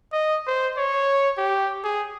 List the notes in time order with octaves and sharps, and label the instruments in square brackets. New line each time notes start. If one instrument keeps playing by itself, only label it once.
[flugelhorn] D#5
C5
C#5
G4
G#4